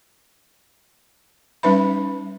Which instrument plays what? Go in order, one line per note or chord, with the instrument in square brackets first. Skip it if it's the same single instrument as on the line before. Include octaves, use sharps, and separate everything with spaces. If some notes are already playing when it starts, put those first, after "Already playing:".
[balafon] G3 C#4 D#4 B4 E5 B5